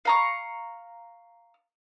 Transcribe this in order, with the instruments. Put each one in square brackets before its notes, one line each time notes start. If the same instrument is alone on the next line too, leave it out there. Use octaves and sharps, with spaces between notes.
[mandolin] F5 A#5 C#6